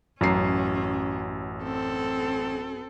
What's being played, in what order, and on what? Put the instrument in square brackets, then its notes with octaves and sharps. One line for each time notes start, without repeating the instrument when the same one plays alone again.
[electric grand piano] A1 [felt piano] F#2 C7 [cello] C#4
[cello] C4 A4